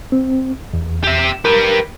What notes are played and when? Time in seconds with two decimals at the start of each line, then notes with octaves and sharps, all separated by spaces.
0.12 C4
0.73 E2
1.04 G4 E5
1.45 G4 A#4 B4